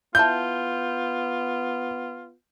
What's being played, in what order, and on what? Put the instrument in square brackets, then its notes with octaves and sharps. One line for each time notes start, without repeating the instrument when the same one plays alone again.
[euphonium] B3 [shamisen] E4 F5 A5 [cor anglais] F4 [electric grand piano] G6